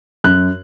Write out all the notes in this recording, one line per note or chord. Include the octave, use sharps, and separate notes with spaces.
F#2 F#6